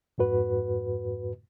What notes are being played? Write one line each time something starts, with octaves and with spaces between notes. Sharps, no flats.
F2 G#2 F#4 B4